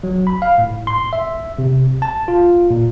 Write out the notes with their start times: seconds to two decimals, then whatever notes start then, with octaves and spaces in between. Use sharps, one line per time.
0.03 F#3
0.27 B5
0.42 F5
0.58 A2
0.87 C6
1.13 E5
1.59 C3
2.02 A5
2.28 F4
2.70 A#2